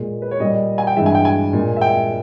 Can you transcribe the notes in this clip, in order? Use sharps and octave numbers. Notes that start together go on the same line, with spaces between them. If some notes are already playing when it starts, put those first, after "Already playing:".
Already playing: A#2 G#3
B4
C#5
A#2 G3 D#5
G#5
G5
G2 E3 G#3 E5
G#5
G5
G#5
A#2 G#3
E5
G5